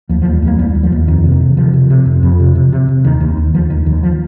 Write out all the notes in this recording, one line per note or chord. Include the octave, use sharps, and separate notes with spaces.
D#2 F3
F3
D#2
G3
D#2 A#3
D#2 G3
D#2
F3
D#2
F2 D#3
C3
D#3
C3
C3 F3
C3
C3
F2
F2
C3
C3
C3
C3
D#2 D#3
D#2
D#2
D#2 F3
D#2 D#3
D#2 D#3
F3